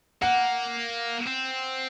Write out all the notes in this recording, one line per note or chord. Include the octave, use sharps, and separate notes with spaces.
A#3 F#5
C4